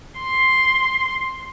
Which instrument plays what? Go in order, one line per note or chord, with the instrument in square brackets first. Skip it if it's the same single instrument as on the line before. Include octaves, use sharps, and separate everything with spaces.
[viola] C6